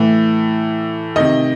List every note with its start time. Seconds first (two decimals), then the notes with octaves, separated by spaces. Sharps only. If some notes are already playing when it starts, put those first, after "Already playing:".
Already playing: A2 E3
1.16 C3 D#3 D#5